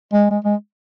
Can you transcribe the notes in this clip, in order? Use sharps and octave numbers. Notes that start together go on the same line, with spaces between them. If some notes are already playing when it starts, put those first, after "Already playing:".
G#3
G#3
G#3